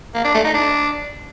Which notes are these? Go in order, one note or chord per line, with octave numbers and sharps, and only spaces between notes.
A#3
D4
A3
D#4
D4